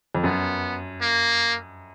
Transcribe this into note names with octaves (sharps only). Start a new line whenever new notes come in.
F2
F#2 B3
A#3